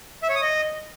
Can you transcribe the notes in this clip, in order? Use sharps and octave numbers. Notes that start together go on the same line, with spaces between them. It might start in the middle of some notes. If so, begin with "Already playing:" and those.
E5
C#5
D#6
D#5